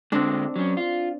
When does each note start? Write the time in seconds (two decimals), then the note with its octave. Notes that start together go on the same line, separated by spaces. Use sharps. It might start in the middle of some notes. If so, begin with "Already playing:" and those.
0.12 D3 G#3 C4 D4
0.56 F#3 C#4
0.77 F4